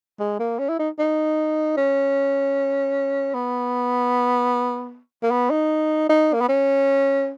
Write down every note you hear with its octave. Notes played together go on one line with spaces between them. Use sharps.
G#3
A#3
C#4
E4
D#4
D#4
C#4
B3
A#3
B3
D#4
D#4
A#3
B3
C#4